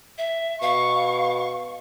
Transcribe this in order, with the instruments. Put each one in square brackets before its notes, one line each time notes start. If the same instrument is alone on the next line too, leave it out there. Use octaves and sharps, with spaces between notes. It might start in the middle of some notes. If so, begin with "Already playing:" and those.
[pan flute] E5
[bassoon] B2 [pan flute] F5 [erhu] C#6